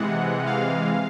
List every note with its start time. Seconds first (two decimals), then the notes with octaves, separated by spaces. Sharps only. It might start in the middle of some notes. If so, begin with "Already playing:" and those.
Already playing: C3 E3 G#3 F#5
0.46 F5